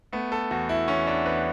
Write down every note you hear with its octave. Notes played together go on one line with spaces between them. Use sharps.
A3 B3
A4
E2 F#4
E4
E2 C#4
D4
E2 B4